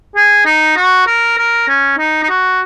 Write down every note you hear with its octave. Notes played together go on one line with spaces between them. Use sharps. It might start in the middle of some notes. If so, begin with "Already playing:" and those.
G#4
D#4
F#4
A#4
A#4
C#4
D#4
D#4
F#4